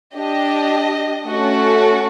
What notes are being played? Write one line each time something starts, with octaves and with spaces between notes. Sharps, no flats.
D4 G4 D#5
A3 C#4 F#4 A4